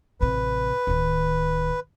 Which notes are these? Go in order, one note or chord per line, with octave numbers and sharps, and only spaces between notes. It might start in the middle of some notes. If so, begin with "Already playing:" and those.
A1 C3 B4
D1 D#3